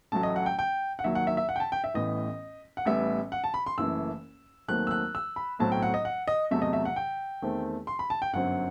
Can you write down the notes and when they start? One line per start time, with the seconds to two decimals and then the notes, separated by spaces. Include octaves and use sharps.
0.12 A1 A2 F#3 A3 A5
0.23 D#5
0.36 F#5
0.46 G5
0.59 G5
0.99 F#5
1.04 D#2 D#3 F#3 E5
1.15 F#5
1.27 E5
1.37 E5
1.49 F#5
1.56 G5
1.60 A5
1.72 G5
1.84 E5
1.94 A1 A2 E3 B3 D#5
2.77 F#5
2.85 A1 A2 G3 B3 E5
3.32 F#5
3.44 A5
3.54 B5
3.66 C6
3.78 F#1 F#2 E3 A3 E6
4.68 D#2 D#3 F#3 A3 C4 F#6
4.87 E6
4.91 F#6
5.15 E6
5.36 B5
5.59 B1 A2 F#3 C4 A5
5.72 G5
5.82 F#5
5.94 D#5
6.05 F#5
6.28 D#5
6.51 E2 C3 F#3 A3 E5
6.62 D#5
6.73 E5
6.85 F#5
6.96 G5
7.42 E2 D#3 A3 C4
7.87 C6
7.99 B5
8.10 A5
8.22 G5
8.33 G1 F#2 F#3 C4 F#5